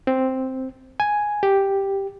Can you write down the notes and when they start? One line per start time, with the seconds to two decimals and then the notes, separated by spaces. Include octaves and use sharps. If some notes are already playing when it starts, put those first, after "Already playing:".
0.07 C4
1.00 G#5
1.43 G4